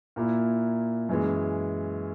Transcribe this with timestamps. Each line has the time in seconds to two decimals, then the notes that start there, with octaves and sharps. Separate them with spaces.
0.16 A#2 A#3 E4
1.09 F#2 E3 G#3